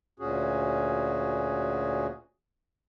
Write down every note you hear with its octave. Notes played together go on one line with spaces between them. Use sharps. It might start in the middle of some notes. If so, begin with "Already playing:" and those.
D2 A#2 C#4 F#4 G#4